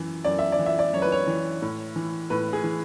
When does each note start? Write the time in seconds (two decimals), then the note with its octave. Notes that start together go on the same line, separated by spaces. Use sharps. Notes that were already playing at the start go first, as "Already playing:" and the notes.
Already playing: F#2 E3
0.24 F#2 D5
0.39 E5
0.52 D5
0.59 E3
0.66 E5
0.79 D5
0.93 F#2 C#5
1.02 B4
1.12 C#5
1.27 E3
1.62 A2
1.96 E3
2.30 A2 B4
2.53 G#4
2.64 E3